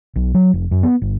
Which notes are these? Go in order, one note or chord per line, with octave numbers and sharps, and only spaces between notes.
B1
F#3
F1
F#2
B3
G1